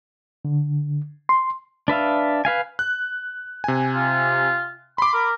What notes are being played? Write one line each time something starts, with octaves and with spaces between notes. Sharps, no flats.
D3
C6
D4 B4 E5 F5
B4 F5 G#5
F#6
C3 G#5
F4
B5 C6 D6
A#4